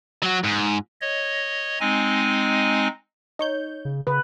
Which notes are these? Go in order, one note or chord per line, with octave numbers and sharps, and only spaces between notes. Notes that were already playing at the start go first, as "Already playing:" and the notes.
F#3 F#4
G#2
C#5 D#5
G#3 C4 D#4 D#5 G#5
D#4 C#5 G6
C#3
C#3 B4